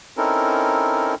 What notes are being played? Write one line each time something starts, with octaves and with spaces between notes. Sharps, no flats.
C4 C#4 D#4 E4 A4 A#4